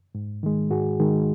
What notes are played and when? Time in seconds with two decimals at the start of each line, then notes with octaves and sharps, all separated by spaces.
0.15 G#2
0.43 D#3 G#3
0.71 G#2 F#4 G#4
1.00 D#3 G#3